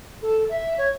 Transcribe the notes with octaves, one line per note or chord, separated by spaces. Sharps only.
A4
E5
C#5